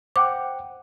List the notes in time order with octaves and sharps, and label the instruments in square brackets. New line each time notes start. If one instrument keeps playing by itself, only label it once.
[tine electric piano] C5 F#5 G5 [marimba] D6